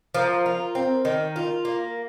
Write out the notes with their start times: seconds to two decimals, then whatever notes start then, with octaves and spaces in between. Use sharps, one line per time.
0.14 F3 A#4
0.46 F4
0.75 C4
1.05 D#3
1.36 F4
1.65 A#3